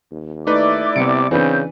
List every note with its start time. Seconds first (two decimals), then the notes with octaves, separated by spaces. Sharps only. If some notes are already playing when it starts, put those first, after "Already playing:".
0.12 D#2
0.47 A3 D#4 E4 B4 D5 D6
0.96 C2 C3 B3 C#7 D7
1.31 C#3 E3 C4 D4 B4 G6